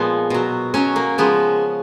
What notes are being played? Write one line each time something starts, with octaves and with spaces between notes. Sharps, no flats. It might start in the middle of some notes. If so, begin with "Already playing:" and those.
Already playing: A#2 F3 G#3 B3
B2 F#3
B2 F#3 C#4
A#3
C#3 F3 G#3 B3